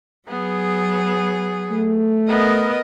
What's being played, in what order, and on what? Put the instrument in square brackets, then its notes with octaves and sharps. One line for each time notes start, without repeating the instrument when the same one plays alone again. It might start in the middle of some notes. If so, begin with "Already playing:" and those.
[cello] F#3 G#4 [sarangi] B3
[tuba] A3
[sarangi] B3 [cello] A#4 D#5